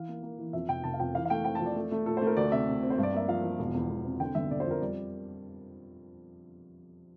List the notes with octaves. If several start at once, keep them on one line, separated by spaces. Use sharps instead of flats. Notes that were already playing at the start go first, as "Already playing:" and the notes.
Already playing: E3 F5
A#3
A#3
E3
F2 E5
F1 G5
F1 A5
F5
F2 G5
E3 F5
F5
A3 G5
C4 G5
A5
F2
D5
A3
A3
A#2 A4
C5
A3
A#4
D2 D5
C3 E5
C3
C4
C5
G2
D5
A#3 E5
F3 F5
F3
E1
E2
E1
C3
D3 G5
G1 E5
D3 D5
C5
F2
A#4
G3 D5